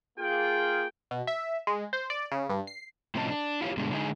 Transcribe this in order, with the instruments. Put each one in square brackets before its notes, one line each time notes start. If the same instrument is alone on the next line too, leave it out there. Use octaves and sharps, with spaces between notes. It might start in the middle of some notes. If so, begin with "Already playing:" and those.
[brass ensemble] A#3 F4 G#4 G5
[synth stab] B2
E5
G#3
C5
D5
C#3
G2
C7
[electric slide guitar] A2 C3 F3 C#4 D#5 A5
D4
E4 F4 G4 C#5
G2 B2 D3 G3 G#3
D3 G#3 D4 D#4 G#4